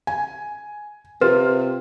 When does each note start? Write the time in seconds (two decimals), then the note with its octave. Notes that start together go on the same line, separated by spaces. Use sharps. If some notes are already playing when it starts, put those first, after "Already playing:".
0.07 G#5
1.21 C3 F4 B4